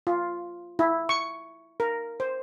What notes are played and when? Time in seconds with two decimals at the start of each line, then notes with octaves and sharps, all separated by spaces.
0.07 F4
0.79 E4
1.09 C#6
1.80 A#4
2.20 C5